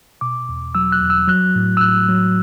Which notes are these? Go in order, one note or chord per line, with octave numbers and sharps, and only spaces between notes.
B2 D6
E2
F#3 E6
F#6
E2
E6
F#3 F#6
A2
E6
A2 F#6
F#3